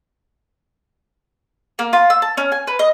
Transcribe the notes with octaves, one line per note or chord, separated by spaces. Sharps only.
A#3
F4
E6
A5
C#4
G#5
B4
D#5